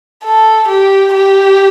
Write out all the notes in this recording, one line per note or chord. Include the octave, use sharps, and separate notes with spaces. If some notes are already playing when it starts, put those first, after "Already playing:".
A4
G4
G4